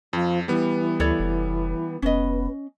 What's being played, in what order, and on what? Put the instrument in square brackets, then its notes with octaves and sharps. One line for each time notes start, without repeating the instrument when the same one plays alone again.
[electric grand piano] F2 [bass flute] F3
[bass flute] E3 [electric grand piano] G3 B3
[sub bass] D2 [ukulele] A4 C#5 D5
[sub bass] F1
[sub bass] F1 [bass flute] B3 [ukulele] C#4 D#5